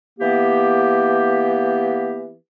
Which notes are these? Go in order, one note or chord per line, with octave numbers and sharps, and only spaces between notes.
E3 A#3 B3 G4